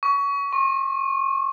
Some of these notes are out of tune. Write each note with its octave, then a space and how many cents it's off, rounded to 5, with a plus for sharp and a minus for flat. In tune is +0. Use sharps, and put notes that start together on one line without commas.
C#6 +25
C#6 -45